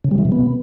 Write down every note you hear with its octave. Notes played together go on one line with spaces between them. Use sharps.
C#3
G3
E3
B2
B3